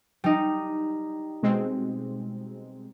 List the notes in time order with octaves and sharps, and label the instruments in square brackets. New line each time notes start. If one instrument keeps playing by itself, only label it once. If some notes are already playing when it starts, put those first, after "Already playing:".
[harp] G3 D#4
[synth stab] B2 G#3 C4